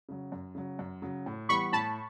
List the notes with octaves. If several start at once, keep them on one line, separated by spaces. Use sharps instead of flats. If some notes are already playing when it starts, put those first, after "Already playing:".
C#3 F#3
F#2
C#3 F#3
F#2
C#3 F#3
A2
E3 G3 B3 B5 C#6
A2 A5 B5